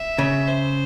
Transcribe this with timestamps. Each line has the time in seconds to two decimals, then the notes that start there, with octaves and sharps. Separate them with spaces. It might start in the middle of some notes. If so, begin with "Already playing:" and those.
Already playing: E5
0.18 C#3
0.47 C5